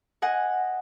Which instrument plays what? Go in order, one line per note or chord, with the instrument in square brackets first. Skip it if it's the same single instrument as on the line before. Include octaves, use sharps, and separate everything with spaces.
[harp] D#5 F#5 G#5